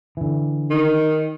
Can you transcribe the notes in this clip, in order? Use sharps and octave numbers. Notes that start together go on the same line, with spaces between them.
D3 E3
D#3